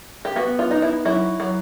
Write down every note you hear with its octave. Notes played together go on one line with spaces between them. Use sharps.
G4
B3 F#4
F4
D#4
E4
F#3 E4
F#3